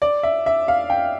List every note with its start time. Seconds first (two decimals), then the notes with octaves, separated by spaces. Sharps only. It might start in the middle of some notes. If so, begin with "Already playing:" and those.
0.02 D5
0.23 E5
0.46 E5
0.68 F5
0.90 G5